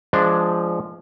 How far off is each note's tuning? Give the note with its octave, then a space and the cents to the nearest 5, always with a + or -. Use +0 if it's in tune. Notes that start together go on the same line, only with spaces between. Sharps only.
F3 -15 G#3 +0 D4 +0